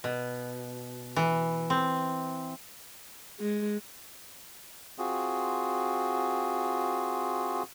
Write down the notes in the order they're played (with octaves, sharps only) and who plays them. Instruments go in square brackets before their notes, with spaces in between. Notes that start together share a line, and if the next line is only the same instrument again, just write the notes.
[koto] B2
E3
C4
[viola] G#3
[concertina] C4 F4 F#4 G#4